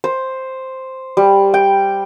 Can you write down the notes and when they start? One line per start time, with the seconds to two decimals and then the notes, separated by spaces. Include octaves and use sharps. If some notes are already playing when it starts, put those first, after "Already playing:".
0.04 C5
1.17 G3
1.54 G5